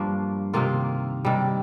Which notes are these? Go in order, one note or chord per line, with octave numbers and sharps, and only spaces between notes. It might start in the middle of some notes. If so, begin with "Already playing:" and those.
Already playing: G2 F3 A#3 D4
C3 D#3 A#3 F4
C3 D#3 G3